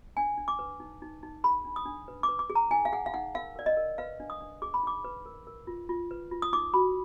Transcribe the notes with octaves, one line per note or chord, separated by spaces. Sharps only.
D4 G#5
D4
D6
B4
D#4
D#4
D#4
G#4 B5
D4
D#6
D4
B4
D6
B4
D6
G#4
A#5
D#4 G#5
F5
G#4 F#5
F5
D#4 F#5
A#4 F5
A#4 D5
D#5
A#4
B4 F5
D4
D#6
D4
G#4 D6
B5
D#4 D6
B4
A#4
A#4
F4
F4
B4
F4
D#6
D#4 D6
F#4 B5